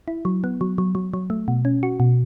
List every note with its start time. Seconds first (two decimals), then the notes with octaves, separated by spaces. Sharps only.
0.08 E4
0.25 F#3
0.44 B3
0.61 F#3
0.78 F#3
0.95 F#3
1.14 F#3
1.30 A3
1.48 B2
1.65 C#4
1.83 F#4
2.00 B2